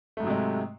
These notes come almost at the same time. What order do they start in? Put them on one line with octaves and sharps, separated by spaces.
A3 G#2 F#3 C3 G#3